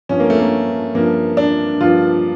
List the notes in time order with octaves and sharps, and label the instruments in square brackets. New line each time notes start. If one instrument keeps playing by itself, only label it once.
[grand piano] G2 F3 C#4
A#3
A3
A#3
G2 F3 A#3
D4
G2 F3 F4